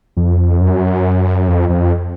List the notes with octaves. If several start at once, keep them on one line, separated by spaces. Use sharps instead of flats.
F2
F#2
F2
F2